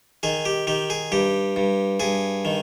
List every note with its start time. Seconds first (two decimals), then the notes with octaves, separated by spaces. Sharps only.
0.23 D#3 G#4
0.45 G4
0.67 D#3 G4
0.90 G#4
1.12 G2 G4
1.56 G2
2.00 G2 G#4
2.45 D#3